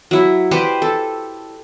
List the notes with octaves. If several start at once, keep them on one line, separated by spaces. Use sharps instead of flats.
F#3 E4
G4 B4 C5 D5
A4